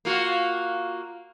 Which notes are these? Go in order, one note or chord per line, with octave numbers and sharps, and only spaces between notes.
A#3 F4 F#4